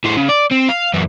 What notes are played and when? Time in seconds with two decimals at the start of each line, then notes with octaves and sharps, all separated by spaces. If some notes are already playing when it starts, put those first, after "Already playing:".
0.04 A2 C5
0.17 C#3
0.29 D5
0.51 C4
0.69 F5
0.93 F#2 E3